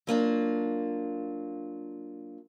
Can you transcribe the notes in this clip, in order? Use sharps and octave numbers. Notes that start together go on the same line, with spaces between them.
F#3 A#3 D4 F4